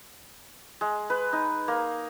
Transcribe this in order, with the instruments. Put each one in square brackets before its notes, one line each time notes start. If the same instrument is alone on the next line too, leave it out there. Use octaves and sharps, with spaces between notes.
[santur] G#3
B4
D#4
A#3